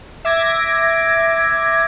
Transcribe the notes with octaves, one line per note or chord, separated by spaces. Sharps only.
E5 D6 G#6 A#6